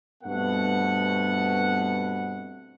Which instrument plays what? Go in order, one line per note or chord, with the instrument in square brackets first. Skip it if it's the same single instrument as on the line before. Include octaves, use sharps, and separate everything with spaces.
[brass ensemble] G2 B2 A3 B3 C4 F#5